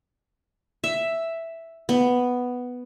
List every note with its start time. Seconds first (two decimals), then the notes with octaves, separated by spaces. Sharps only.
0.84 E5
1.89 B3